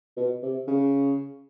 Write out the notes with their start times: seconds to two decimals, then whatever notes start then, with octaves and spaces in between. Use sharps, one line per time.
0.17 B2
0.43 C3
0.67 C#3